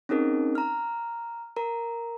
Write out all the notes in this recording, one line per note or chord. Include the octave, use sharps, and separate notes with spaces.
C4 C#4 D#4 G#4 A#4
A#5 F6
A#4 A#5